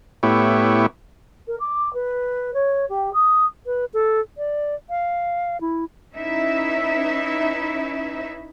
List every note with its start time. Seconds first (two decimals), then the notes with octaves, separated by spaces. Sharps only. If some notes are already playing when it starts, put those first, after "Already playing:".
0.23 A2 B3 E4 G4 C#5
1.47 A#4
1.60 D6
1.93 B4
2.54 C#5
2.89 G4
3.13 D#6
3.66 B4
3.94 A4
4.38 D5
4.90 F5
5.61 E4
6.13 C#4 D#4 E4 B4 E5